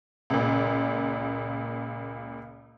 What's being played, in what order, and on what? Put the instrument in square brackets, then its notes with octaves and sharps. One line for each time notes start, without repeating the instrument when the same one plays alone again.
[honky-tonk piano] C#2 A#2